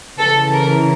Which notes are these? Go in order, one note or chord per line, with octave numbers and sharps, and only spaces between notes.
C#3 E3 A4
A#4